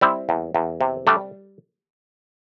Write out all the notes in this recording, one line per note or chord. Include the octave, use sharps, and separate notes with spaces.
G3 C4 E4
E2
E2
C3
G3 A3 D4